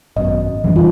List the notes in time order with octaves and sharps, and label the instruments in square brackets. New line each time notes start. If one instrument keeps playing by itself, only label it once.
[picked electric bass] G#1 F#2 B2 [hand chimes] D#5
[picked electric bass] F#1 F2 D4 [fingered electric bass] E3 F#3 G3
[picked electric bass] C2 F2 D#3 [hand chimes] F4